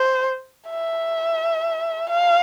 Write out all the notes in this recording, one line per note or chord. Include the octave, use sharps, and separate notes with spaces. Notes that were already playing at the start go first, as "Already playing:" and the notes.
Already playing: C5
E5
F5